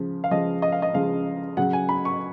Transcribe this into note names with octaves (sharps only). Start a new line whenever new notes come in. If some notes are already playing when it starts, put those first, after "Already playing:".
Already playing: C#3 F3 G#3
F5
C#3 F3 G#3 D#5
D#5
F5
D#5
C#3 F3 G#3 F5
C#3 F#3 F#5
G#5
B5
C#6